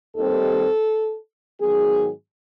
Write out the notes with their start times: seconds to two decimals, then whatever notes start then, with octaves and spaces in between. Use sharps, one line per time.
0.16 D#2 D#3 G3 C4 A4
1.60 G#2 D#3 F#3 B3 G#4